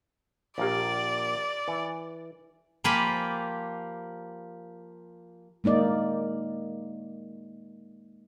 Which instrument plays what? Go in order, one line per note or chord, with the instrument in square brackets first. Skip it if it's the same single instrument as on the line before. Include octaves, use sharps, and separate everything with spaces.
[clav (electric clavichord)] A#1 A#3 [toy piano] G4 F5 [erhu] D5
[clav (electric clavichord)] E3 [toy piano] G#5
[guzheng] F3 A#3 F4 G4 G#5 B5
[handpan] G#3 A#3 D#4 D5